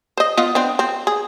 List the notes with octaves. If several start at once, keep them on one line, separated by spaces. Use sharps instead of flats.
C5 D#5
B3 F4 D#5
B3 C4 D4
C4
G#4